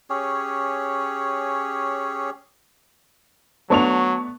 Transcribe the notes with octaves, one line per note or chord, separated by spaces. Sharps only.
C#4 G4 G#4 C#5
F#3 A3 B3 D4 A5 C#6 F7